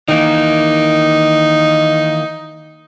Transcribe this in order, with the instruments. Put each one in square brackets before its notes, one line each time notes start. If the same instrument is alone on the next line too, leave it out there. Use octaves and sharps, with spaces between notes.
[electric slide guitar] D#3 E3 A#3 [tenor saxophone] D#4